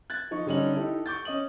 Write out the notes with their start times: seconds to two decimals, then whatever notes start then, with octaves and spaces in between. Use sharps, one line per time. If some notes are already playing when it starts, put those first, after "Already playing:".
0.10 F#6 G#6 A6
0.31 F3 D#4 C#6
0.46 D3 G3 C#4 D#4 F#7
0.76 D#4 E4 G4 A4
1.06 C#6 D6 G6 A6
1.25 C#4 D#5 D#6 F#7